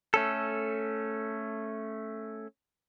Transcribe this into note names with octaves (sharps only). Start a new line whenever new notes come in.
A3 C#4 A4